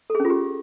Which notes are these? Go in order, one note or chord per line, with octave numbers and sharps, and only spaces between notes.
A4
G#4
C#4
F4
G4